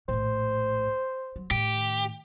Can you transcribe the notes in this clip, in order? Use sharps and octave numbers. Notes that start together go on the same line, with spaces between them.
A#1 A2 C5
F#3
A2 D#3 G4